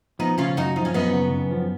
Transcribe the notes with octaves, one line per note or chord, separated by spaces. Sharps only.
F3 B3 D#4
C#3 C#4 F4
F#2 D#4 F#4
F3 D#4
C#4
F#2 B3 D#4
C#3
F#2
F3